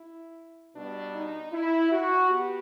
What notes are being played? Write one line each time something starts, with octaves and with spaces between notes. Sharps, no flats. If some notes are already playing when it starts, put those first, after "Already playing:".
Already playing: E4
B2 G3 B3 D4
D#4
E4
F#4
B3 G4